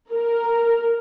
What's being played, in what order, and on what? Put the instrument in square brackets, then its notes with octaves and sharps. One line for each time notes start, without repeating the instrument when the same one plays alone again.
[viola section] A#4